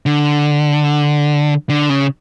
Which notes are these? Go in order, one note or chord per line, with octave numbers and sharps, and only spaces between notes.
D3
D3
C#3